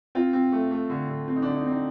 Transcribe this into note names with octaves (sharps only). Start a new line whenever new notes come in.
C4 F4
C4
A3
A3
D3
D3
C4
D#4
D4
D3
D#4
C4
D#4